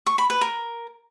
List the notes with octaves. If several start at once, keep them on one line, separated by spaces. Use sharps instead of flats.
C#6
B5
B4
A#4